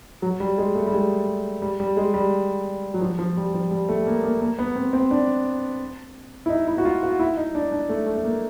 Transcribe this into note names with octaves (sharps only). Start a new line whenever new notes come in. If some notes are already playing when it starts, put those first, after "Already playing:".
F#3
G3
G#3
A3
G3
G#3
G3
G3
G#3
G3
F#3
F3
F3
G3
F3
G3
A3
A#3
A#3
A#3
B3
C4
C4
D4
E4
D#4
E4
F#4
F4
F#4
E4
D#4
D4
D4
A3
A3
A3
A#3